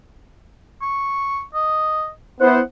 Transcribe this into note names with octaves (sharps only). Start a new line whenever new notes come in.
C#6
D#5
B3 E4 C5 F#5